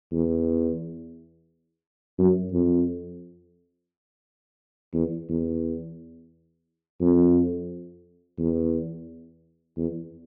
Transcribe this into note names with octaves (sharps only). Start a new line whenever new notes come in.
E2
F#2
F2
E2
E2
F2
E2
E2